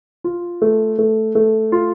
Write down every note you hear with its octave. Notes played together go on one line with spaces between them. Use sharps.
F4
A3
A3
A3
F4